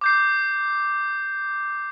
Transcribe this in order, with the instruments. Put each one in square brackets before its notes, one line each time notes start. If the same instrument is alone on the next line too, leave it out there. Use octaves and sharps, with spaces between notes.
[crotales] D6 G6 C7